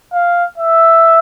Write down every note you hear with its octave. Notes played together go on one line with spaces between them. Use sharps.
F5
E5